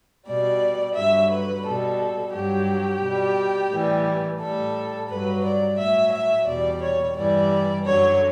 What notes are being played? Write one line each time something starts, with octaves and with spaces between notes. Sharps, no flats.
B2 G3 D5
G2 D3 F#3 E5
B4
B2 G3 A4
G2 F#3 G4
B2 G3
A2 E3 G3
A2 G3 A4
G2 F#3 B4
D5
A2 F#3 E5
E5
E2 B2 G3 D5
C#5
G2 E3 G3 D5
F#2 D3 F#3 C#5